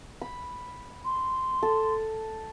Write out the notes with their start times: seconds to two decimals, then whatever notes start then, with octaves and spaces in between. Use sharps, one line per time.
0.21 B5
1.05 C6
1.63 A4